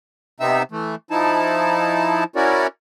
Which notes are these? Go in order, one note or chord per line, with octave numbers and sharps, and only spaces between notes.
C3 B3 C4 D#4 E5 E6
E3 A3
F3 D#4 E4 A5
C#4 E4 F#4 A#4 C#5 D5